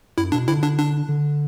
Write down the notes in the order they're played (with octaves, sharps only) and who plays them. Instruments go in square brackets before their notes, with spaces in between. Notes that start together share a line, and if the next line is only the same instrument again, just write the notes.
[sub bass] F#2 [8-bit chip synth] E4
[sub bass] B2 [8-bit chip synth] D4
[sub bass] D3 [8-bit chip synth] E4
[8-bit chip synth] D4
D4
[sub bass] D3